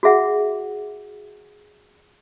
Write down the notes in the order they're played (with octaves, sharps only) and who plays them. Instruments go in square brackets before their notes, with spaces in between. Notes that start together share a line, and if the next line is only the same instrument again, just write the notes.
[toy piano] F#4 G#4 E5 F#5